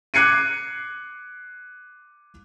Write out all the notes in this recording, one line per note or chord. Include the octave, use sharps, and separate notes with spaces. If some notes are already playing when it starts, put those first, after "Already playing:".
D6 F#6 G#6 C7 C#7 D#7